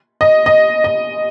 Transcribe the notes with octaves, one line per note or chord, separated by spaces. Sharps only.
D#5
D#5
D#5